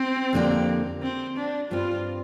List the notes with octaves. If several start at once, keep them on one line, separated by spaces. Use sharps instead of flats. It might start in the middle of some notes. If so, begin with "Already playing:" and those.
Already playing: C4
F2 D3 A#3 G4
C4
D4
G2 G3 C4 F4